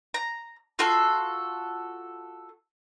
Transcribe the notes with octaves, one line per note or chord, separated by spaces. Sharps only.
A#5
F4 F#4 A4 C6